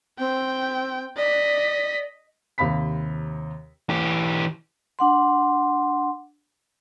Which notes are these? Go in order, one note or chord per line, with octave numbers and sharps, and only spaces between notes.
C4 G5
D5 D#5 B6
D#2 C3 F5 B5 B6
E3 G4
D4 F#5 C6